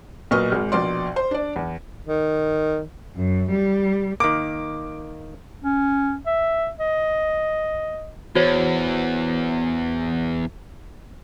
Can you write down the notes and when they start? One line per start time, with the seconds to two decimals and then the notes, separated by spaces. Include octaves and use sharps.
0.31 B1 A#2 B4 D#5 C#6 F6
0.52 G#1 G#3
0.72 A#1 B2 D5 C6
1.16 C5
1.31 D4 D5
1.56 E2
2.07 D#3
3.15 F#2
3.51 G3
4.20 D#3 A#3 D6
5.64 C#4
6.26 E5
6.80 D#5
8.35 E2 F#4 C5 C#5